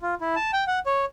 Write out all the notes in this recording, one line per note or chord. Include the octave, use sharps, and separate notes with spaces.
F4
E4
A5
G5
F#5
C#5